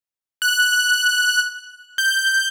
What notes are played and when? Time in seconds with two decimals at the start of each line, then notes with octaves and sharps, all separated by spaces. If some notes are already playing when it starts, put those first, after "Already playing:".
0.42 F#6
1.98 G6